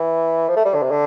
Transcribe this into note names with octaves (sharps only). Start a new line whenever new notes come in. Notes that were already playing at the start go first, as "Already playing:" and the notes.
Already playing: E3
F3
A3
G3
D3
C3
D3